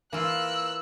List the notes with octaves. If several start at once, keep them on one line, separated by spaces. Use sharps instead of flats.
E3 A#3 F4 E6 F#6